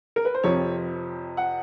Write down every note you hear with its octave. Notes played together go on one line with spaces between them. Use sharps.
A#4
B4
C5
F2 C3 F3 C#5
F#5